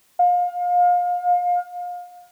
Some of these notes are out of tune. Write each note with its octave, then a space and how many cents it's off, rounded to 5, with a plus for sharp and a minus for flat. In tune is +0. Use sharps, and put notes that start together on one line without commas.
F5 +30